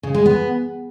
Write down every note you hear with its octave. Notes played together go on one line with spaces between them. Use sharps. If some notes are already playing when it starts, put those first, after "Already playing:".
C#3
G#3
B3